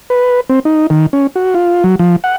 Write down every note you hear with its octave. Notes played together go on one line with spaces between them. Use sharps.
B4
C4
D#4
D#3
C#4
F#4
F4
F#3
F3
F#5